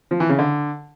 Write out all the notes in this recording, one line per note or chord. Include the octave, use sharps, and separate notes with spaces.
F3
E3
C#3
D3